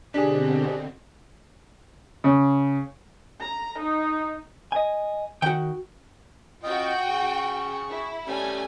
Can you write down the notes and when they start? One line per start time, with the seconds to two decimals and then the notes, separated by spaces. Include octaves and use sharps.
0.14 B2 D3 C4 D4 G4 G#4
2.24 C#3
3.42 A#5
3.80 D#4
4.72 D#5 G#5
5.42 D#3 F#4 G5
6.63 F4 F#4 D#5 G5
7.07 G#4 C#6
7.91 E4
8.27 G3 A3 C#4 G#5